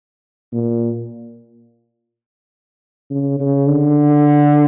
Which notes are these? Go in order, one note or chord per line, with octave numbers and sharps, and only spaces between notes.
A#2
C#3
C#3
D3